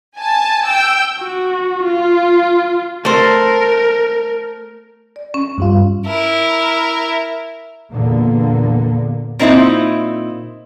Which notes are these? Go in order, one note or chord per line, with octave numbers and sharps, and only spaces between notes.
G#5 A5
G5 E6
F#4
F4
A3 A#4 C5
D5
C#4
G2 G3 F4
E4 A#4
E2 A#2 D3 A#3 B3
A#2 C4 D#4 E4